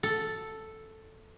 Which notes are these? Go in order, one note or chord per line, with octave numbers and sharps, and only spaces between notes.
A4